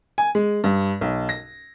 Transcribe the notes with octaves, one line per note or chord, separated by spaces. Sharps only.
G#5
G#3
G2
B1
A#6